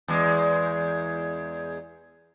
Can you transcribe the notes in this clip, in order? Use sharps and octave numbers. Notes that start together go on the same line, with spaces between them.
E2 G#3